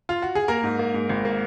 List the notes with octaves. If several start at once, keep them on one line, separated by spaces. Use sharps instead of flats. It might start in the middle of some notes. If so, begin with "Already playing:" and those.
F4
F#4
G#4
A#3 A#4
G#2
A#3
G#2
G#1
A#3